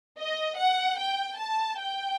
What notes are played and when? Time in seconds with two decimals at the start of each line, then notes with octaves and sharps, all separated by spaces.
0.18 D#5
0.57 F#5
0.98 G5
1.38 A5
1.79 G5